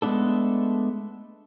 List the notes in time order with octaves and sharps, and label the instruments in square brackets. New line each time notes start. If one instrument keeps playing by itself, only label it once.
[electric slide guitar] G#3 A3 B3 D4 A4